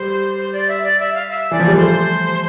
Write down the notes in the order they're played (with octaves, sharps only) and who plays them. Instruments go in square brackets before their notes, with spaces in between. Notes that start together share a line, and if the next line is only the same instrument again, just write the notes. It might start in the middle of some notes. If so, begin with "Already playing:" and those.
Already playing: [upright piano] G3 [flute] C5
[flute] C5
D5
E5
D5
E5
F5
E5
[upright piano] E3 [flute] D5
[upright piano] F3
G3
[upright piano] A3 [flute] C5